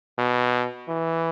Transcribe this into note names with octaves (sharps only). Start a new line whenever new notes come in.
B2
E3